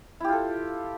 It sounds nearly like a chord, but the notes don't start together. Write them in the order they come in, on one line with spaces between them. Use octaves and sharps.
E4 G4 F4 A4